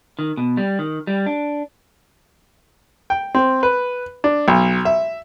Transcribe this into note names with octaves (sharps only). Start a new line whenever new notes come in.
D#3
B2
G3
D#3
G3
D4
G5
C4
B4
D4
B1
E5